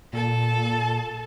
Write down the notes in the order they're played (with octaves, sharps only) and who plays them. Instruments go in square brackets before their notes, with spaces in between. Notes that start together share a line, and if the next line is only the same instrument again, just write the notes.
[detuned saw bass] A#2 [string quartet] A4 A5